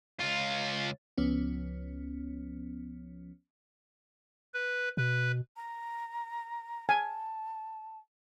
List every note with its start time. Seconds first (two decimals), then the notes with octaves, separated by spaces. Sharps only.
0.20 C#2 F4
1.18 C#2 F3 B3 C#4
4.54 B4
4.97 B2 B4
5.57 A#5
6.89 G#5 A5